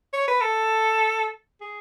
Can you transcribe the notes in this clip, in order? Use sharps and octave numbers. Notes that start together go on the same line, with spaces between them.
C#5
B4
A4
G#4